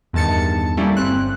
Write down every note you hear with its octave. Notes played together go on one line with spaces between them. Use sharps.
E2 G2 D#3 A5 A6 C#7
G3 A3 A#3 C#4 E4
G1 C4 F#6